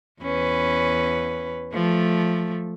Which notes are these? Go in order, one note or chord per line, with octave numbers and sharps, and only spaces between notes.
E2 C#4 B4
F3 A3